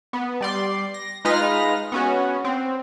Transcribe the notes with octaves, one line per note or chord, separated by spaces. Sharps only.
B3
G3 D5 C6
A#6
G#3 D#4 F4 B4 F6 A#6
B3 C#4 F#4
C4